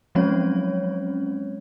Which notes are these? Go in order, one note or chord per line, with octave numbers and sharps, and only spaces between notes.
F3 F#3 G#3 C4 C#4 C#5